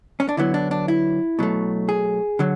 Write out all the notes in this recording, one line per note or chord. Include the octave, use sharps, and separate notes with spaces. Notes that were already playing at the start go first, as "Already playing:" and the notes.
C#4
D4
D3 F#3 B3 E4
D4
D4
E4
B2 F#3 A3
G#4
D3 F#3